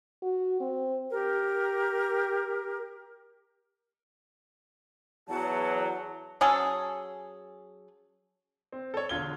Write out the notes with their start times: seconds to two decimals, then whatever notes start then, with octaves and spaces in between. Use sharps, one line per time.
0.22 F#4
0.60 C4
1.10 G4 A#4
5.29 E2 F#3 F#5 A5
6.41 F#3 C#4 G#4 A4
8.72 C4
8.94 A4 C#5
9.09 E1 D3 F4 G#6 G7